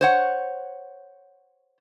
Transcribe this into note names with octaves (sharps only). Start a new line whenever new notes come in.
C5 C#5 F#5